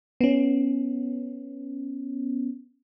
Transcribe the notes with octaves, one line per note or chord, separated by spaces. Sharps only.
B3 C#4